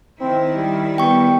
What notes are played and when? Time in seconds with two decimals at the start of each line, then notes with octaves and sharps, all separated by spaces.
0.20 D#3 C4 E4
0.55 G3
0.98 G3 B3 G5 C#6